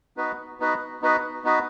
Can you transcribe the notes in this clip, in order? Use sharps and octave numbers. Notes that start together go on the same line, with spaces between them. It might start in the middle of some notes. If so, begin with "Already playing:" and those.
B3 D#4 F#4 B4
B3 D#4 F#4 B4
B3 D#4 F#4 B4
B3 D#4 F#4 B4